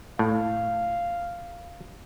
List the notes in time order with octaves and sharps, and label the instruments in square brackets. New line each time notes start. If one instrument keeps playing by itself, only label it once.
[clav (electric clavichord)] A2 [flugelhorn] F5